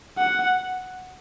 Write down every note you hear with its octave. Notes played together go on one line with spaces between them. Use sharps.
F#5